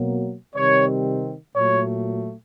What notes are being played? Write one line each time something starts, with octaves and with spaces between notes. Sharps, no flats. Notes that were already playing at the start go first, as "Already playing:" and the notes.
Already playing: B2 F#3 A#3
C3 D#3 G3 C4 C#5
A#2 F#3 A3 C#5